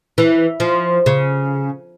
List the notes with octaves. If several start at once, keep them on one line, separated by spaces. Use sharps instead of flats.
E3
F3
C#3